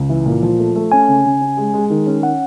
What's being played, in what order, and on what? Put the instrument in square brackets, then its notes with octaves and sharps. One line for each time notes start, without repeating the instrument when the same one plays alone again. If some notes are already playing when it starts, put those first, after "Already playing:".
Already playing: [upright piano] C#2
E3
A#2
F3
A3
A3
[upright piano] C#4 [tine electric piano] G#5
[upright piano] C#3
C#3
C#4
G#3
G#3
D#3
C#4
[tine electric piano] F#5